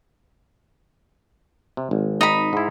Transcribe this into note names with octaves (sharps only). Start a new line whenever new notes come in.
C3
G#1
D#4 B5
G#2 E4